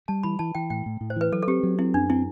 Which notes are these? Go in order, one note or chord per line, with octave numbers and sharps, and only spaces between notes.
G3 A5
E3 B5
E3 A5
E3 G5
A2 G5
A2
A2
C5
E3 B4
F#3 A4
A4
C4 G4
F#3
C4 E4
F#2 D4
C4 E4